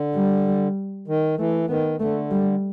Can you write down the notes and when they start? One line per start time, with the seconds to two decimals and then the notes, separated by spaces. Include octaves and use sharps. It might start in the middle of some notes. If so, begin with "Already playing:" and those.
Already playing: D3
0.16 G3
1.08 D#3
1.38 E3 A3
1.69 D#3 B3
2.00 D3 A3
2.31 G3